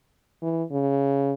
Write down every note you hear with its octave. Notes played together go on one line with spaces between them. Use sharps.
E3
C#3